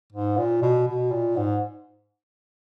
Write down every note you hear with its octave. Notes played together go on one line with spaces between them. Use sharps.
G#2
A#2
B2
B2
A#2
G#2